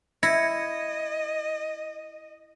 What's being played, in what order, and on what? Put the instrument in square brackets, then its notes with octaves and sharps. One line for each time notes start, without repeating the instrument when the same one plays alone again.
[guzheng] E4 [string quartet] D#5 [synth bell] G#6 A#6 C#7